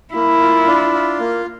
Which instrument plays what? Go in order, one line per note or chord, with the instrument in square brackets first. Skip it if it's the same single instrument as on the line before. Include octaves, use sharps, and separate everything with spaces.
[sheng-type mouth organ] A#3 [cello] E4
[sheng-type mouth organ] F4
D4
F4
A#3